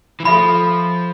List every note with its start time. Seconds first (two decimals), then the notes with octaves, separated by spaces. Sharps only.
0.20 E3
0.25 F3 A4 E5 B5